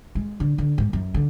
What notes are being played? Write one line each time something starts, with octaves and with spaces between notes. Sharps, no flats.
G#3
D3
D3
G#2
F#2
D3